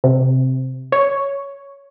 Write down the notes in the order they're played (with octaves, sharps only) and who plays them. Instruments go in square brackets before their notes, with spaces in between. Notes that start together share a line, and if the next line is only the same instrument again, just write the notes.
[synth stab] C3
C#5